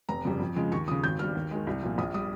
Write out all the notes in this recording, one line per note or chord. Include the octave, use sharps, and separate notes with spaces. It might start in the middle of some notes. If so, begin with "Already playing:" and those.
F1 A#5
F2 C#3 G3
F2
C#3 F3 G#3
D#2 C#6
C#3 F3 D#6
G#1 G6
G2 G3 F6
D#2
D#3 G#3
C2
A#2 F3
A#1 D#6
G3 D#6